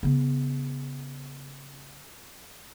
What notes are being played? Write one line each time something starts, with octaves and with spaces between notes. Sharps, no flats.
C#3 B3